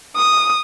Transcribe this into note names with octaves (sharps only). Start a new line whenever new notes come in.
D#6